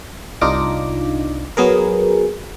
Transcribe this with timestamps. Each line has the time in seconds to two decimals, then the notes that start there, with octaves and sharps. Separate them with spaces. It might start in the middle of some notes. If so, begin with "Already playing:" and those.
0.41 C2 D4 D#4 F4 D6 A#6
1.57 F#3 B3 G#4 A#4